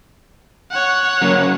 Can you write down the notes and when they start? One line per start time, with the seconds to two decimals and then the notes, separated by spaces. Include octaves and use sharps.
0.71 C#5 F#5
1.21 F#3 A#3 C#4